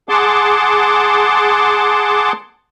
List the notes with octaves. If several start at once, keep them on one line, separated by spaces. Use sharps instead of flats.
G#4 F#5 A5 C6 D6